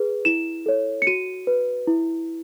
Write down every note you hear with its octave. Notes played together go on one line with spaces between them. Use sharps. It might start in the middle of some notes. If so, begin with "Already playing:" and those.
Already playing: G#4 B4
E4 E7
A4 C#5
C#7
F#4 D#7
B4
E4